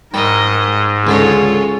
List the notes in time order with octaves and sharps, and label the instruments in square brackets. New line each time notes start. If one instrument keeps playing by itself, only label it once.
[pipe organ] G#2 [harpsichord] G3 [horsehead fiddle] A#4 [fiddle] D#5
[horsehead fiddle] G#3
[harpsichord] C#2 D3 D#5 [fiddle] F4 C#5 [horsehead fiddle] G#4 A4